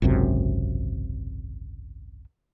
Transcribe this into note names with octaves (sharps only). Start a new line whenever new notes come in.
G#1 C#2 F#2 C3